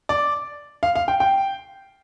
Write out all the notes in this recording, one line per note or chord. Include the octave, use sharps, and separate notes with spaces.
D5
F5
F5
G5
G5